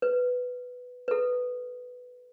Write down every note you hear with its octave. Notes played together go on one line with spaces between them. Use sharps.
B4
A4 B4